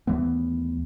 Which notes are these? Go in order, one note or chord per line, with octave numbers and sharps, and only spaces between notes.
D#2 E3 A3 B3